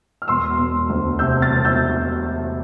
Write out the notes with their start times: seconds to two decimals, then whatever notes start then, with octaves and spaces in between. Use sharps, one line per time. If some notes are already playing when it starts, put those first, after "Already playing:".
0.22 F6
0.28 E1 C6 E6
0.58 E1
0.90 D2
1.19 C3 E6 G6
1.42 F6 A6
1.50 E1
1.65 E6 G6